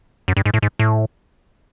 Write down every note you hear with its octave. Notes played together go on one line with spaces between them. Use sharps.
F#2
G2
G#2
A2
G#2
A2